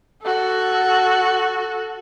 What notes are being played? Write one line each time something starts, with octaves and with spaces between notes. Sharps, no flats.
F#4 A4